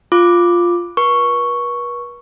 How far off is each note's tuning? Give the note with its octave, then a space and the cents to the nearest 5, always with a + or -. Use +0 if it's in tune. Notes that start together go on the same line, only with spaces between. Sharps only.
F4 +0 D6 +0
B4 -40 C#6 +0